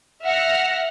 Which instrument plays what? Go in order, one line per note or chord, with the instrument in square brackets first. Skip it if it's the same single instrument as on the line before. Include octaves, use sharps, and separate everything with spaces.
[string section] E5 F#5 F6 A#6